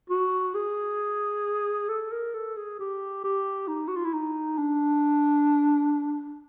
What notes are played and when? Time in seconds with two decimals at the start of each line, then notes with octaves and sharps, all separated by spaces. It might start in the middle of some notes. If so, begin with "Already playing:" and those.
0.10 F#4
0.54 G#4
1.89 A4
2.12 A#4
2.34 A4
2.56 G#4
2.79 G4
3.24 G4
3.68 D#4
3.88 F#4
3.96 F4
4.05 E4
4.13 D#4
4.58 D4